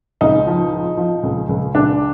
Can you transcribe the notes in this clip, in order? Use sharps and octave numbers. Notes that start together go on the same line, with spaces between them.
C#2 D#4
F3
F3
F3
C#2
C#2
C#2 D4